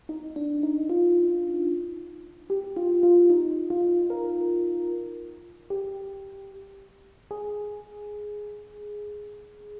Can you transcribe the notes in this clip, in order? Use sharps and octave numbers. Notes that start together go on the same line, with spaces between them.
D#4
D4
D#4
F4
G4
F4
F4
D#4
F4
A#4
G4
G#4